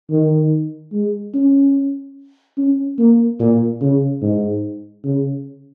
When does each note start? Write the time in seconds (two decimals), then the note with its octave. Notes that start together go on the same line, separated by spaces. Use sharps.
0.11 D#3
0.93 G#3
1.34 C#4
2.58 C#4
2.99 A#3
3.40 A#2
3.81 C#3
4.22 G#2
5.04 C#3